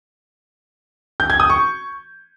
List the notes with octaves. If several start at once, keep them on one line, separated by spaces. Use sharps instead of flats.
G6
G#6
D#6
C#6